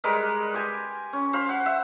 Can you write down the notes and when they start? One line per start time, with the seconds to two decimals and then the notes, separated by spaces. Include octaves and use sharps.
0.04 G3 G#3 A#4 B4
0.54 G4 G#5 C6
1.13 C#4
1.33 C5 F5 B5
1.49 F#5
1.66 E5